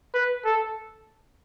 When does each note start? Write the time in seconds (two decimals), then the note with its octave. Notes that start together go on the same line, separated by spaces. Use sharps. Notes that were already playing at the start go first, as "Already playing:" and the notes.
0.14 B4
0.45 A4